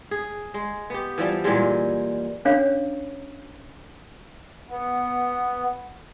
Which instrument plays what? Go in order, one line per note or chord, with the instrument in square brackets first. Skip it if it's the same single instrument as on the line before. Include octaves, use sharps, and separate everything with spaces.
[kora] G#4
G#3
B3 G4
E3 F3 G3
A#2 E3 G3 G#3
[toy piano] C#4 D4 C#5 F5
[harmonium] B3